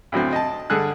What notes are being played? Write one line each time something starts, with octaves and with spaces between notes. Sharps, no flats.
D2 A2 F#3 C4
D#5 A5
G2 D3 G#4 A4 F#6